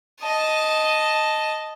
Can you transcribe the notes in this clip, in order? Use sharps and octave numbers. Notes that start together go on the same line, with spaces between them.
D#5 A5